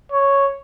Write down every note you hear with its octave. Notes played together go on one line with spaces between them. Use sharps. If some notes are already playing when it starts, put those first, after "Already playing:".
C#5